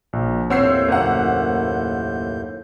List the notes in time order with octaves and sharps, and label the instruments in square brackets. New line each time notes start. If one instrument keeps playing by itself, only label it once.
[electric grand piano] A#1
[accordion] D#2 A2 G6 [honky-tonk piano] C4 E6 C7 [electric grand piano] C#5 F#5
[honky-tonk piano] F#1 F#5 [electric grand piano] A#4 C5